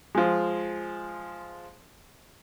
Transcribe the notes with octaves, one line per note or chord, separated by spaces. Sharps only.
F3 G#3